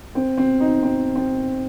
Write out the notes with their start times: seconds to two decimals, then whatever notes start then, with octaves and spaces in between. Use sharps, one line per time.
0.15 C4
0.37 C4
0.60 D#4
0.83 C4
1.16 C4